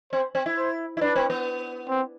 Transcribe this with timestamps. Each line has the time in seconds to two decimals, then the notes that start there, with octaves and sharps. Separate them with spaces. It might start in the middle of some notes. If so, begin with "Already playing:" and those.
0.13 C4 C5
0.35 C4
0.46 E4
0.57 C5
0.97 E4
1.00 D4 B4
1.16 C4
1.30 B3
1.89 C4